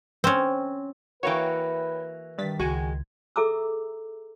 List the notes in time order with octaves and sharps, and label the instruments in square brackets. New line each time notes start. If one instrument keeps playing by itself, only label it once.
[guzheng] C4 C#4
[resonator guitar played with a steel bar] E3 A#3 F#4 [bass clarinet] B4 [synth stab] C#5 G5
[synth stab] G2 A6 B6 [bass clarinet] D#3
[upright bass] C#2 [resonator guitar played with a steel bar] G#3 [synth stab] F#4 G#5
[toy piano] G#4 A4 E5 A#5 D6 E6